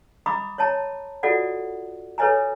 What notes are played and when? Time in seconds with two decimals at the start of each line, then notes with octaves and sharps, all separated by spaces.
0.26 D#5 A#5 B5 D6 D#6
0.58 C#5 D#5 A5 A#5
1.23 F4 F#4 A4 D5 D#5 F#5
2.18 A4 B4 C#5 D#5 G#5 A#5